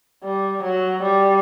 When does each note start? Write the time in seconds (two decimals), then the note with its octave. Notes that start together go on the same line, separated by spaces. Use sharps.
0.24 G3
0.64 F#3
1.03 G3